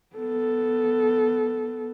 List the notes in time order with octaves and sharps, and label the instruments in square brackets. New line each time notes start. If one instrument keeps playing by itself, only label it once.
[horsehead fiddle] B3 A4